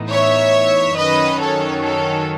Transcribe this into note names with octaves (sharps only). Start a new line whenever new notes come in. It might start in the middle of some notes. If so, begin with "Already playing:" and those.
Already playing: A2 E3 B3 D#4
C#5 E5
F#2 D#3 F#3 C#4 B4 D#5
A4 C#5
A4 C#5